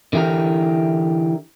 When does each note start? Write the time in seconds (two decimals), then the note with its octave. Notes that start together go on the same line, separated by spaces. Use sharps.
0.13 D3 E3 E4 G4 A#4